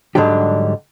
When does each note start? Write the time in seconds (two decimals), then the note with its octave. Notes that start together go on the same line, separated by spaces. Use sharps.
0.15 G#2 D3 F#3 G3 D4 G4